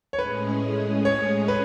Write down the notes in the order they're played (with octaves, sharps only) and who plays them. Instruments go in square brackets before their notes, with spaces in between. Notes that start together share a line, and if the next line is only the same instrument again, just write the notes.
[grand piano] C#5
[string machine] A2 G#3 C#4 G#4 [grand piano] B4
[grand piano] C#5
B4